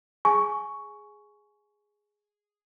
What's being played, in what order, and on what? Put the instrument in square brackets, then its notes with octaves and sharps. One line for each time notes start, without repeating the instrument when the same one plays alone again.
[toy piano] G#4 G#5 C#6